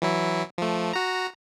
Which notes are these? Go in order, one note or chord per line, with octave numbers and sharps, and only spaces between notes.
E3 F#3 E4
F3 A3
F#4 A#5